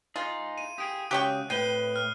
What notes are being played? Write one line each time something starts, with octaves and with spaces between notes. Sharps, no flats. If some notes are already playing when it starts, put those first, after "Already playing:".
D#4 F4 G#4
E4 D#7
G4 G#4 D#6 D7
C#3 F#3 G#3 G4 C#5 E5 G5 F#6
A2 C4 B4 G5 C7 D#7 G7
F6